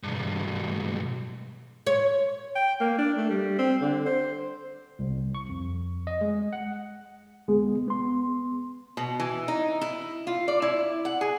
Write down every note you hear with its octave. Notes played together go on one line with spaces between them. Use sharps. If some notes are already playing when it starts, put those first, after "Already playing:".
B1 G2
C#5
G5
A#3
D4
A3
G3
C4
D3
C5
C2
C#6
F2
D#5
G#3
F#5
D2 G#3 B3 G#4
B3 C6
B2
E3
D#4
E4
F4
D5
E4
F#5
G#4